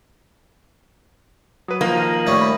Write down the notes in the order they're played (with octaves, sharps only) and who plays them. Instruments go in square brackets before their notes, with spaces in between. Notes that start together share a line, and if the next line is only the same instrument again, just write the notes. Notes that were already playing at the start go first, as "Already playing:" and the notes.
[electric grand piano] F#3 B4 [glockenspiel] D#6 D#7
[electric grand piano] D#3 F3 [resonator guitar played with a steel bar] A#3
[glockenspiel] F6 A#6 D#7
F#7
[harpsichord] A2 G3 C#4 [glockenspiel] D#6
[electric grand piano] B5